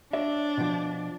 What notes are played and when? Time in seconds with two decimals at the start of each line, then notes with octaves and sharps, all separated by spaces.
0.13 D4 C#5 D5 E5
0.57 B2 F3